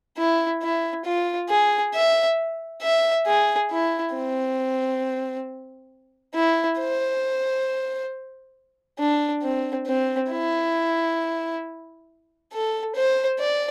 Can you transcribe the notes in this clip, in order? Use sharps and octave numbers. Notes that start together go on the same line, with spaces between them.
E4
E4
F4
G#4
E5
E5
G#4
E4
C4
E4
C5
D4
C4
C4
E4
A4
C5
D5